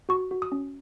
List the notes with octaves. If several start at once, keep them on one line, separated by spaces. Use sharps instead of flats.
F#4 C#6
F#4
D#6
C#4